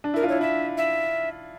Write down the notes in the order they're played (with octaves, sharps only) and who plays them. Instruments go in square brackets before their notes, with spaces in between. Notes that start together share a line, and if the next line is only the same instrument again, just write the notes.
[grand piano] D4
[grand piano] E4 [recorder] A#4
[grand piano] F4
[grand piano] E4 [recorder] C#5
[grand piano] E4 [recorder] E5
[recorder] E5